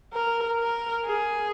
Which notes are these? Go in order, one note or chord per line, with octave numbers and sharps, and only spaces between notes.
A#4
A#4
G#4